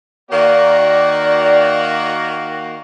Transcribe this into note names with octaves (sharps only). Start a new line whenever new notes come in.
D#3 A#3 F#4 D5